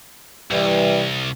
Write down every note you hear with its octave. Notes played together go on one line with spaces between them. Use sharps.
C2 E3 G3